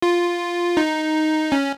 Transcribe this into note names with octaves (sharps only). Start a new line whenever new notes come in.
F4
D#4
C#4